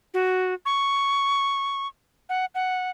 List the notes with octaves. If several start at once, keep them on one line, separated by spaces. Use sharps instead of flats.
F#4
C#6
F#5
F#5